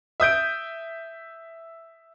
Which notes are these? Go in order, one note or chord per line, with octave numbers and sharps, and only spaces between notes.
E5 D#6 G6 D7